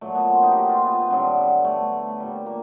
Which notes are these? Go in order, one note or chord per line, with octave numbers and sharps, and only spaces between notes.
A#2 F#3 A3
B3
C4
D#4
F#4 G4
F4
B3
B3
G2 D3 F#3 C4
B3
A3
A3
A#2 G3
A#3